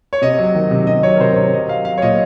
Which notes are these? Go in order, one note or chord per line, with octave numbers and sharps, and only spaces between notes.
C#5
C3 D#5
F#3
D#3
C3
C3 D#5
F#3 C#5
A#4
C3 C5
C3 C#5
F#3 D#5
F#3 F5
F#3 F5
C#5
A#2 D#5